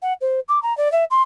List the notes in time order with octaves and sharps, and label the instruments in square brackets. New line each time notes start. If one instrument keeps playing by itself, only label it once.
[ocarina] F#5
C5
D6
A#5
D5
E5
C6